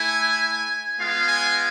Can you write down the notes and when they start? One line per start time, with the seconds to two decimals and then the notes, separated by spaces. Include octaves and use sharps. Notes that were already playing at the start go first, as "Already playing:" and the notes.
Already playing: A3 E4 G#5
0.98 G#3 B3 F4 F5
1.27 G#5